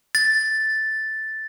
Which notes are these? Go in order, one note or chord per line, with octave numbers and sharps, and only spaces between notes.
A6